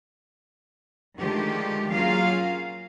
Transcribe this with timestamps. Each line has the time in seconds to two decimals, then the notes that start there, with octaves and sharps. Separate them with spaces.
1.19 D3 D#3 F3 G#3 A3 G4
1.92 F#3 A#3 C#4 F4 G#4 F5